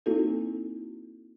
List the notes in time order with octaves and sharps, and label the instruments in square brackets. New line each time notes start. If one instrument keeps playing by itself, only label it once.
[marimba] A#3 C4 D#4 E4 F#4 A4